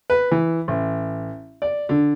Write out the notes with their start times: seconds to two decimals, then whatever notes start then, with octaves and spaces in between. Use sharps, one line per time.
0.10 B4
0.31 E3
0.68 A1
1.62 D5
1.89 D3